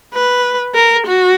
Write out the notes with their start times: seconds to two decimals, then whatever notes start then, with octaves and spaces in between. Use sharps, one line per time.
0.14 B4
0.75 A#4
1.06 F#4